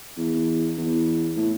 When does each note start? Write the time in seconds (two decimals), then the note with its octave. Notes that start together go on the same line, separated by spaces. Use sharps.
0.17 E2
0.77 E2
1.36 A2